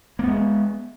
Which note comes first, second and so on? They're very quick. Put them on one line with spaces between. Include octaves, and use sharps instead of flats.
A#3 B3 G#3